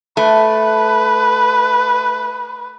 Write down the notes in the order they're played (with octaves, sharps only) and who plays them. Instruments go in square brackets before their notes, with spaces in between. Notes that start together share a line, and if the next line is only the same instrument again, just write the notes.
[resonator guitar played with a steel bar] A3 [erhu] B4